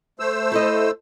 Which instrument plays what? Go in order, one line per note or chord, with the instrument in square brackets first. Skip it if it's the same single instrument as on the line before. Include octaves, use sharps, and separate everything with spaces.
[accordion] A3 C5 E6
[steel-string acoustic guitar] E4 A4 D#5